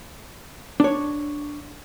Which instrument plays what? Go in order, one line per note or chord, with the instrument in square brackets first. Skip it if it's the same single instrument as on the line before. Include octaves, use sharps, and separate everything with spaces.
[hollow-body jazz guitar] D4 C#5